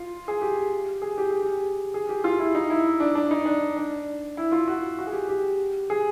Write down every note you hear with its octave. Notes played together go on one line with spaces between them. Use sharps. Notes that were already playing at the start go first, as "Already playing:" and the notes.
Already playing: F4
G#4
G4
G#4
G4
G#4
G4
G#4
G4
F4
E4
D#4
E4
D4
D4
D#4
D4
D4
E4
F4
F#4
F#4
G#4
G4
G4
G#4